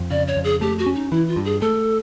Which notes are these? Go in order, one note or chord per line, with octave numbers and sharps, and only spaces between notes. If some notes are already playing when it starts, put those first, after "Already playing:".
Already playing: F2
C#3 D5
C#5
F2
G#4
A3 G4
F#4
C#4
D#4
E3 E4
F4
G2
G#4
A3 A4